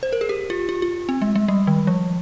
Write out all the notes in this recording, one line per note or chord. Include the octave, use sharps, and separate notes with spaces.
C5
A#4
G#4
G4
F4
F4
F4
C4
G#3
G#3
G3
D#3
F3